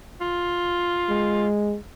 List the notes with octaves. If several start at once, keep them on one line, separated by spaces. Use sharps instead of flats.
F4
G#3